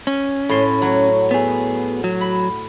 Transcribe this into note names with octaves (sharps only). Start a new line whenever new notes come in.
C#4
A2 C6
F#3
B3 G#4
F#3
B5